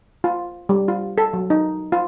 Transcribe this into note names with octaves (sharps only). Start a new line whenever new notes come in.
F4
G3
F4
A4
F#3
D#4
F4